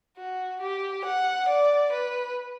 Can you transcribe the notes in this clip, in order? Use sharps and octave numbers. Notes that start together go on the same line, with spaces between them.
F#4
G4
F#5
D5
B4